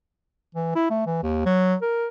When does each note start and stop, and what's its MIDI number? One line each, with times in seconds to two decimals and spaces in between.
0.55 0.73 52
0.75 0.88 64
0.90 1.06 57
1.06 1.21 52
1.23 1.45 39
1.46 1.75 54
1.82 2.07 70